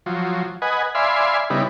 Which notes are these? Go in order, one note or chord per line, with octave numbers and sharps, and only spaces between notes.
F3 F#3
B4 D#5 F#5 G#5
D5 E5 F5 G#5 B5 C6
C#3 G3 B3 D#4 E4